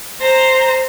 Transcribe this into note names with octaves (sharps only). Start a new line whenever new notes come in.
C5 A#5